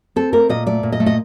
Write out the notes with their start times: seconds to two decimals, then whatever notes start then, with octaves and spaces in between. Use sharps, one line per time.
0.16 C4 A4
0.33 A3 A#4
0.49 A#2 D#5
0.67 A3 D5
0.83 A#2
0.92 D#5
1.00 A3
1.06 D#5